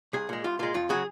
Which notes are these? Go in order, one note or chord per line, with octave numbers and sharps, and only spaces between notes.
C2 G#4
A#2 G#3
C2 F4
A#2 G#3 F4
F2 F4
C#3 F#3 G#4